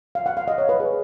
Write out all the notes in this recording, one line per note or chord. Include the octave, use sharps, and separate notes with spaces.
F5
F#5
F5
D#5
C#5
B4
G#4